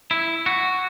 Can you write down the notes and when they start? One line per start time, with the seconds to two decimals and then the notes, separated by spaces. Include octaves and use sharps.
0.11 E4
0.46 F#4